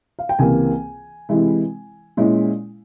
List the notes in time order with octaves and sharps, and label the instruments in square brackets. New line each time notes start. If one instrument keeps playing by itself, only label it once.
[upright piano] F5
G5
C#2 C3 E3 A#3 G#5
C3 E3 G#3 E4
A#2 G#3 C#4 E4